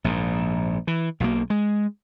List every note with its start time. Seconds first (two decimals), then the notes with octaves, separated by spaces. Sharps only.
0.04 A#1 G#2
0.87 E3
1.20 B1 B2 E3 A#3
1.50 G#3